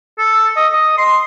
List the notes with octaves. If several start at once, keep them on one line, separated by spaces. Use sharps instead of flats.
A4
D#5
D#5
C6